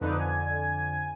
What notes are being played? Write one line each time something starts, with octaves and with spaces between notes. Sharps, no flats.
F2 D3 D#4 B4
G#5